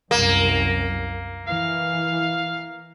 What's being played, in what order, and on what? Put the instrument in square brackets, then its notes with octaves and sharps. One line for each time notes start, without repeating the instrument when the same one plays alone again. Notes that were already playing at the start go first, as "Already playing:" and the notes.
[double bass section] C2 F#2 [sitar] A#3
[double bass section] E3 [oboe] F5